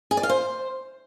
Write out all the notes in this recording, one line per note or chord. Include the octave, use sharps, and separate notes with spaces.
G#4
D5
F5
C5